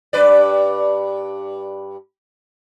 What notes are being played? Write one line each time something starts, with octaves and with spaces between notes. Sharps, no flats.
G2 B4 D5